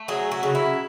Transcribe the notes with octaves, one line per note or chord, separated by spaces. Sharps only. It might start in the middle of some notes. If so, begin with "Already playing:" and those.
Already playing: A3
F#3 G#4
F#4
C#3
E4